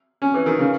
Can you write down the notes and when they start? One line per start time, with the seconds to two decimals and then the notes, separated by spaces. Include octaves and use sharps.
0.22 C#4
0.34 E3
0.46 D#3
0.59 C#3